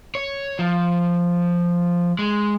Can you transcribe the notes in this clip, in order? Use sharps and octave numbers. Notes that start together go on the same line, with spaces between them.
C#5
F3
G#3